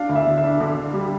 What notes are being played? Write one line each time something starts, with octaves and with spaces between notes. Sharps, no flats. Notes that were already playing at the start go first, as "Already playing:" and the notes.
Already playing: D4 F5
D2
E5
D3
E5
D4
D3
D4
G3